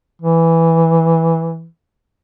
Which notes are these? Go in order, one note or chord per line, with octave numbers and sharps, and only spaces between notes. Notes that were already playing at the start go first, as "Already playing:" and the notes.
E3